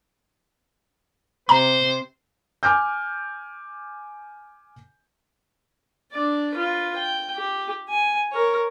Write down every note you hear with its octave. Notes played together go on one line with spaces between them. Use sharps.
C3 C5 A#5
G#5 D6 F6 G6
D4 D5
F4 B4
G5
G4
G#5
A#4 C#5